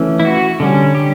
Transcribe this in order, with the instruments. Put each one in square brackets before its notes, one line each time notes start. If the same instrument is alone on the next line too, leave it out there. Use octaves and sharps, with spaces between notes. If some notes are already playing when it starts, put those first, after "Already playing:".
Already playing: [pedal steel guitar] E3 A3 C#4
E4
F#4
D3 G3 C#4
G4